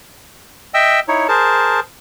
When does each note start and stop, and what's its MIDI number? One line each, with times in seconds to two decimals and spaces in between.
0.74 1.00 75
0.74 1.00 76
0.74 1.00 79
0.74 1.00 88
1.08 1.27 63
1.08 1.27 64
1.08 1.27 73
1.28 1.80 68
1.28 1.80 70
1.28 1.80 72
1.28 1.80 81